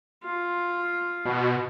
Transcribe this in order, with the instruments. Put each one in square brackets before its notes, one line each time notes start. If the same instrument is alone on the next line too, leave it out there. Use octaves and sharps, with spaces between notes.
[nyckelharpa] F4
[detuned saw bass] B2